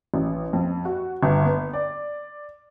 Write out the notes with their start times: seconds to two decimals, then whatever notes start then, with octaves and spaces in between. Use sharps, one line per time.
0.14 A1
0.53 F2
0.85 F#4
1.23 G1
1.45 B3
1.73 D5